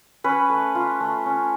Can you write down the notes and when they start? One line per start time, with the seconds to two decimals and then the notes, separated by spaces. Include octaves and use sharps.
0.24 C#4 B4
0.50 A3
0.75 F4
1.01 A3
1.26 C#4